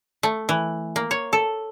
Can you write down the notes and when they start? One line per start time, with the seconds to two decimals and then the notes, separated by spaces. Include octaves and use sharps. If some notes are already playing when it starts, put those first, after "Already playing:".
0.23 A3
0.49 E3
0.96 A#3
1.11 C#5
1.33 A4